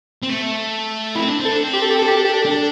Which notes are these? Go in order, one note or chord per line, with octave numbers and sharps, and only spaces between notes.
C4
A3
C4 E4
D4
C4
A4
D4
C4
G4
A4
G4
D4 A4
G4
A4
G4
A4
D4 G4
A4